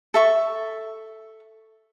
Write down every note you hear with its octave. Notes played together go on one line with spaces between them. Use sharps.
A4 E5 C#6